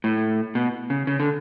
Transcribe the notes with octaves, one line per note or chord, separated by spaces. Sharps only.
A2
B2
C#3
C#3
D3